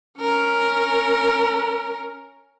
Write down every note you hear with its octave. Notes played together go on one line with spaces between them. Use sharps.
C#4 A#4